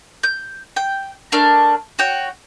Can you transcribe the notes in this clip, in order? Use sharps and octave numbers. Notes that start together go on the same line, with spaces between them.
G6
G5
A3 D4 A#4 F6
F#4 C#5 G5